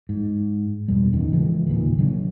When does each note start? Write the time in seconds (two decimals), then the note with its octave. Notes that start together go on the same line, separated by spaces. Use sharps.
0.09 G#2
0.88 E2 B2 G3
1.13 D1 E2 D#3 C#4
1.32 C#3 E3 F3 G#3
1.67 D#1 A1 A#2 D#3
1.98 C#3 F#3 D4